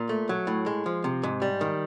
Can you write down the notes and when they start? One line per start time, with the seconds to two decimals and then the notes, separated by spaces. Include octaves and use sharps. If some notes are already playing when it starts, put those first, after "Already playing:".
Already playing: A#2
0.09 A3
0.29 F#3
0.47 A2
0.66 G#3
0.86 F3
1.04 C3
1.23 G#2
1.42 G3
1.61 D#3